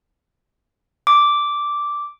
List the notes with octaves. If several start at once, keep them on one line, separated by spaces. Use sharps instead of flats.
D6